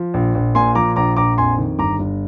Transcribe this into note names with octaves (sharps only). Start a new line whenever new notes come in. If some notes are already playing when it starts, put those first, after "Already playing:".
Already playing: F3
A#1
A#1
A#2 G#5 C6
F3 A#5 D6
A#1 A#5 D6
A#1 A#5 D6
F2 G#5 C6
D#3
G1 A#5 D6
G1